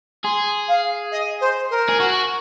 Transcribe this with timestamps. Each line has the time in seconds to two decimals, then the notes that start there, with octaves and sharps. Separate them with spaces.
0.24 G#4 C6
0.68 F5
1.12 D#5
1.41 C5
1.70 A#4
1.89 G#4
2.00 F#4